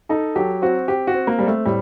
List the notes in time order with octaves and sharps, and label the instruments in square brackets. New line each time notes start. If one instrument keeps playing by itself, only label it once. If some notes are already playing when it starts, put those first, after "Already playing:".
[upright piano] D#4 [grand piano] A4
[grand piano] F#3 [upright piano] G4
[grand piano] C4 [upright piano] F#4
[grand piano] C4 [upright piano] G4
[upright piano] F#4
[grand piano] C4
[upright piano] A#3
[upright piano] G3 [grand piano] C4
[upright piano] A3
[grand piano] A2 [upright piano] G3